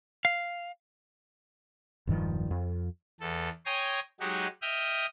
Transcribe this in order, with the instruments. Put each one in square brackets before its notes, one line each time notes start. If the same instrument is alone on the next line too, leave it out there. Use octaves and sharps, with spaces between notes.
[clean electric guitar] F5
[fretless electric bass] E1 G2 D#3 F3
F2
[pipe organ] E2 A4
C#5 G5 G#5 A#5 C6 D#6
F#3 G#3 D#4 F#4 G4
D#5 E5 G5 D#6 F6